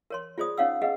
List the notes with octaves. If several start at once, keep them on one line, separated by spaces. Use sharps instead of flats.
A#4 C#5 C6
F4 G#4 C5 D5 D#6
C#4 D#4 C#5 F5 F#5 E6
G#4 B4 D#5 F5 F#5